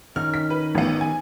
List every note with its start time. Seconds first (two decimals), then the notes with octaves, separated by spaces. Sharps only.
0.16 D#3 C#4 D#4 F6
0.34 B6
0.50 B4
0.75 A1 B3
1.01 G#5